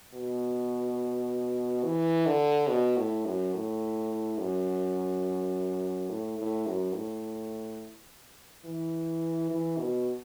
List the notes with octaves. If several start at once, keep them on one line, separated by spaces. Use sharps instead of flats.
B2
E3
D3
B2
A2
F#2
A2
F#2
A2
A2
F#2
A2
E3
E3
B2